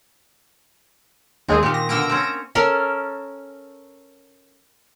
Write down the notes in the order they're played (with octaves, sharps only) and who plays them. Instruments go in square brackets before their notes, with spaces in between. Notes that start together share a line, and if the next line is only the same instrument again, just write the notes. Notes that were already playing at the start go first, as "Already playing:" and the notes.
[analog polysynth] D#2 G#3 G#4 [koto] C4
[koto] A#2 D#3 [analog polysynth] G4
[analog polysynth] A#6
[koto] B2 D3 A#3 [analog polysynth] E6 A#6 D7
[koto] C4 C#4
[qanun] C#4 A4 A#4